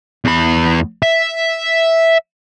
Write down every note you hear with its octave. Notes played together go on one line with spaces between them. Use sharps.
E2 B5
E5